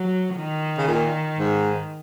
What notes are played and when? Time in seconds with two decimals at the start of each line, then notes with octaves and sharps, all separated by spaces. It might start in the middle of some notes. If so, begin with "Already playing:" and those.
Already playing: F#3
0.36 D#3
0.78 C#3
0.88 A#2
1.39 G#2